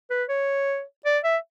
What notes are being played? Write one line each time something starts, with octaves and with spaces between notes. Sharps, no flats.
B4
C#5
D5
E5